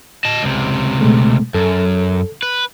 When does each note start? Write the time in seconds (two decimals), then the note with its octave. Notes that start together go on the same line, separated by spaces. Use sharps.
0.25 D#5 A5
0.43 C#2 C3
1.01 B2 G#3 A3
1.54 F#2 A4
2.43 B4